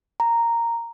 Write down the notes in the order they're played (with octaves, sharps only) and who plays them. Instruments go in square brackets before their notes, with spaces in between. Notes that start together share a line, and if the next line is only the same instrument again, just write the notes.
[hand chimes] A#5